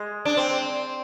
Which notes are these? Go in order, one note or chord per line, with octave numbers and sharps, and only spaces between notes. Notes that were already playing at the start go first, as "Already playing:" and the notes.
Already playing: G#3
D4
C4